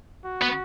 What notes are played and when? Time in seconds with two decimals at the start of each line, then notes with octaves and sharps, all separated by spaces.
0.25 F#4
0.42 B3